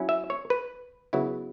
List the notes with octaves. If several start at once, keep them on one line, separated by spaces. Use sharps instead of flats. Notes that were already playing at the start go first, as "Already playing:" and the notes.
Already playing: F#3 C#4 E4
E5
C#5
B4
C#3 F#3 B3 E4